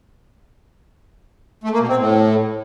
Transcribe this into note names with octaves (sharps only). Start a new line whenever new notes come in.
A3
A#3
B2
C4
A2